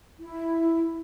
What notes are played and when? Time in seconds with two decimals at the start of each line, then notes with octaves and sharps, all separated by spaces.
0.20 E4